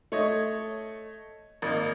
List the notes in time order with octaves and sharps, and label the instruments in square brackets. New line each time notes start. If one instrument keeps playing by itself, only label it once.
[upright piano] A3 C#5 D#5
G#1 A#3 D#5